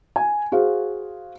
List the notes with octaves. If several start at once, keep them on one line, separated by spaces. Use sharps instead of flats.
G#5
F#4 G#4 C5 F5